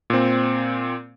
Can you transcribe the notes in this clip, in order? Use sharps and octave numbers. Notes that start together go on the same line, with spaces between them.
A#2 C4